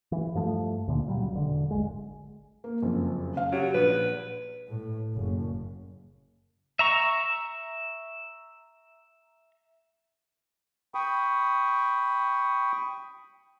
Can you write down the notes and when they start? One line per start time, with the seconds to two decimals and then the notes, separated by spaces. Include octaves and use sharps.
0.12 E3
0.35 G2 F3 A3
0.88 D2 A#2 D3
1.08 A#2 C#3 F#3 G3
1.32 E1 D3
1.71 G#1 G#3
2.64 A#3
2.82 F#1 F2
3.36 C#3 F5
3.52 F#3 G4
3.74 A#1 B4
4.68 A2
5.15 F#1
6.79 E5 A#5 C#6
10.95 G5 B5 C#6 D#6